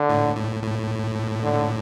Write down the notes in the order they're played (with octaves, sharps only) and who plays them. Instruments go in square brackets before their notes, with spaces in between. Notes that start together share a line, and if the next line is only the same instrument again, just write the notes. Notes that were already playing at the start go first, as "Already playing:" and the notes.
Already playing: [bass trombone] D3
[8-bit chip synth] A2
A2
A2
[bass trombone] D3